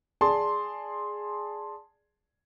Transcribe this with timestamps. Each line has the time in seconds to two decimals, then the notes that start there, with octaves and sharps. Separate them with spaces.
0.21 G#4 D5 A5 C6